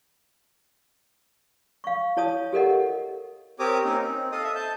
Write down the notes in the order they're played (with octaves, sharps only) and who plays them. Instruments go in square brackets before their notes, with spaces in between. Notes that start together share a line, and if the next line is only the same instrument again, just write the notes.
[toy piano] F5 C#6
E4 C#5 A5 D#6
G4 A4 A#4 D#5 F#5
[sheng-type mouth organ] C4 G4 A#4 C#5 D6 D#6
A#3 C4 C#4 D#4 A#4
C4
A4 D#5 F5 D#6
E5 D#6
A5 G6